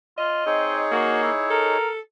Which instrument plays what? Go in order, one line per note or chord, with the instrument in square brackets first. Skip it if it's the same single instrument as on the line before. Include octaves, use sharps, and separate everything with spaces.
[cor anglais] F4 [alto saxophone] D#5
[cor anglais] C4 [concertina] D#4 G#4 C#5
[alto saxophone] A#3 [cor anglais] F#4
[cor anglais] E4
[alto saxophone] A4 [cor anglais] A#4